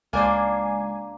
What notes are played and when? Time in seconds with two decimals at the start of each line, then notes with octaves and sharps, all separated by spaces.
0.13 C#2 A#3 D4 C5 G#5 G#6